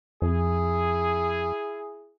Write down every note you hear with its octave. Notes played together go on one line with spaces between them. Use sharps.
F2 E4 G#4